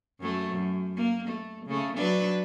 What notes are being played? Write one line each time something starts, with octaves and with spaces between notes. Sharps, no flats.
F#2 F#3 A3
F#2
A#3
A3
C#3 A3
F#3 D4 B4